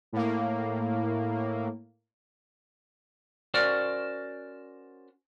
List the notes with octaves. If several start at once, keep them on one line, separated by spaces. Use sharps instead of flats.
A2 A#3
C#4 F#4 A#4 C5 D5